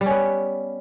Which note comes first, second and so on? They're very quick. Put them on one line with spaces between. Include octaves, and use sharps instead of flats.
G3 C#4 B3